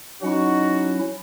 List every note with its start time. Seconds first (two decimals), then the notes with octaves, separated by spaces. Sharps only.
0.22 F#3 C#4 D#4 E4 F#4